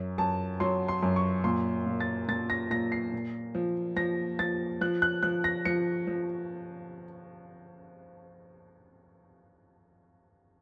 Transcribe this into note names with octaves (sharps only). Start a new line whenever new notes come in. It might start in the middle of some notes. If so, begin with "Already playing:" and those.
Already playing: F#2
F#2 A5
F#3 C6
C6
F#2
C#6
A#2 C6
A#2
A6
A#2 A6
A#6
A#2 A#6
C7
A#2
F3
F3 A#6
F3 A6
F3 F#6
F#6
F3 F#6
A#6
F3 C#7
F3